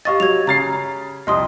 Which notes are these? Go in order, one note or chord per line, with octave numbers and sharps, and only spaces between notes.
G4 D#5 F5 C#6 A6
F#3 G#6 F7
C#3 A#5 A6 C7
C2 F2 D#5 C6 D#6